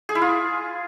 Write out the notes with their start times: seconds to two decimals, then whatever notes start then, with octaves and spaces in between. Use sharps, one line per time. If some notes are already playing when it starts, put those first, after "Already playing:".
0.09 G#4
0.15 E4
0.22 F4